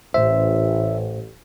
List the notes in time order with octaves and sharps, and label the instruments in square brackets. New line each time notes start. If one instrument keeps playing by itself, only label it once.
[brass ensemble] A1 [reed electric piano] A2 C5 [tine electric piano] E5